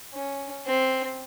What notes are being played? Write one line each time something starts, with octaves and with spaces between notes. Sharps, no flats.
C#4
C4